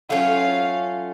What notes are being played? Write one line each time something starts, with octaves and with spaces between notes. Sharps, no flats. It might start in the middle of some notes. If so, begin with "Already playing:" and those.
F#3 A3 C#4 F4 F5